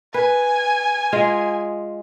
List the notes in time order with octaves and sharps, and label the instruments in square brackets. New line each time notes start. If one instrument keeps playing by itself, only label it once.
[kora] B4 [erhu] G#5
[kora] G#3 F4 G#4